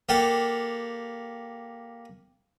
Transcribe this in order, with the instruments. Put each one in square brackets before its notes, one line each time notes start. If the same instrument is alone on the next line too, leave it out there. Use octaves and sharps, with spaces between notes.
[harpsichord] A#3 G4 A4 F5 F#5